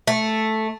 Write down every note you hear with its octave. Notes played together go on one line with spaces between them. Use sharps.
A3